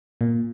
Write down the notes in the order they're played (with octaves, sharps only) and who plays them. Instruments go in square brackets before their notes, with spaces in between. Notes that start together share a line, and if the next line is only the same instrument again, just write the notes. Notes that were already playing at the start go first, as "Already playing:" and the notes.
[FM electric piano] A#2